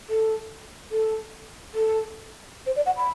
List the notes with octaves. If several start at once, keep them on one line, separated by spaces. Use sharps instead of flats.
A4
A4
A4
C5
D5
F#5
B5